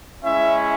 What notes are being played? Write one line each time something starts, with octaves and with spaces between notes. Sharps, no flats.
G#3 C#4 E4 E5